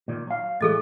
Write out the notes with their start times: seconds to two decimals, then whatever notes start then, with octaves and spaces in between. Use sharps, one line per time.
0.08 A#2 D#3
0.27 F#3 F5
0.61 A2 E3 G#3 G#4 A4 D#5